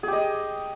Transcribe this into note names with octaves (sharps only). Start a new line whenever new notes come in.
G4 G#4 D#5